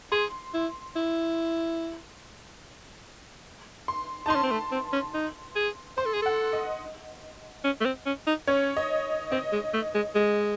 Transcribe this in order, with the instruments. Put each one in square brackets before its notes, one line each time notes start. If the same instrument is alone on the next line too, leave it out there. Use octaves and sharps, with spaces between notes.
[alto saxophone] G#4 [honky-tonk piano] C6
[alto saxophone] E4
E4
[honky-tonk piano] C6
[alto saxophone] D#4 [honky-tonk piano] A5 C6
[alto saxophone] C#4
C4
A3
C4
C#4
D#4
G#4
[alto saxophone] C5 [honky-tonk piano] C6
[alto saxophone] A4
G#4
[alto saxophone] A4 [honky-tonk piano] F#5
[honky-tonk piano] D#5
[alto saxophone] C#4
A3
C4
C#4
D#4
[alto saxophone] C#4 [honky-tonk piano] C#5
[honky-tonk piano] D#5
[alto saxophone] C4 [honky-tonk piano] D#5
[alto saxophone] G#3
A3
G#3
G#3